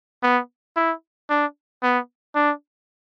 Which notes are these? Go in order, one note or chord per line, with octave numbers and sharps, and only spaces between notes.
B3
E4
D4
B3
D4